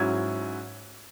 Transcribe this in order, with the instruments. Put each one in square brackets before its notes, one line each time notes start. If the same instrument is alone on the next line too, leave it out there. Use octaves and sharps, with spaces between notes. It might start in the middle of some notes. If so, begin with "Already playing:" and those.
Already playing: [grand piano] G#2 F#3 C#4 E4 E6 G#6